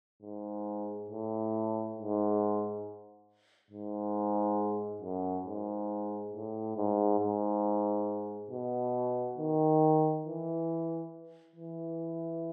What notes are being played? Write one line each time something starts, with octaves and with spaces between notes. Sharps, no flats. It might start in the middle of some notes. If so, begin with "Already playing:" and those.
G#2
A2
G#2
G#2
F#2
G#2
A2
G#2
G#2
B2
D#3
E3
E3